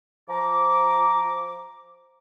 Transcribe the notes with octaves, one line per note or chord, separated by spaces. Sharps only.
F3 A#5 D6